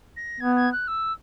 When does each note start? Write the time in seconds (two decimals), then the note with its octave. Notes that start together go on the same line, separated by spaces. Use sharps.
0.17 A#6
0.40 B3 G#6
0.56 G#6
0.72 F#6
0.88 E6